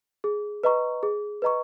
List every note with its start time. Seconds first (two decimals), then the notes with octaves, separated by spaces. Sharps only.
0.24 G#4
0.63 B4 D#5 A#5 C#6
1.03 G#4
1.42 B4 D#5 A#5 C#6